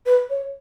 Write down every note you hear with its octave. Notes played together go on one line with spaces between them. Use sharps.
B4
C#5